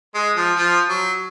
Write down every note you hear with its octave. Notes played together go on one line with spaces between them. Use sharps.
G#3
F3
F3
F#3